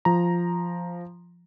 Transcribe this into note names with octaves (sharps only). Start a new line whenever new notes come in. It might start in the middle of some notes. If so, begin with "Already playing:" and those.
F3 A#5